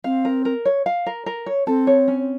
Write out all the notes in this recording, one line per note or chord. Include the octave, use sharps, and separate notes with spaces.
C4 F5
A#4
A#4
C#5
F5
A#4
A#4
C#5
C4 A4
C#5
C#4